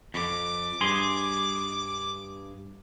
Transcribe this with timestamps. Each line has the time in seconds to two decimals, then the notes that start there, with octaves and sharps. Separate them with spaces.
0.14 F2 D6
0.81 G2 G#4 C6